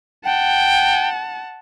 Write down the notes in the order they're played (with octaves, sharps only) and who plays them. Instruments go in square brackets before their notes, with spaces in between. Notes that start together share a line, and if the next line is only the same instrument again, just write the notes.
[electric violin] F#5 A5 [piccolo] G5